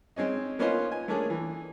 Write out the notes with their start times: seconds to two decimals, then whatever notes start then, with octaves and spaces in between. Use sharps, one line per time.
0.16 G#3 C4 C#4 D#4
0.59 A#3 B3 C#4 D#4 F4 C5
0.92 G#5
1.08 A3 A#3 C#4 D4 G#4
1.30 E3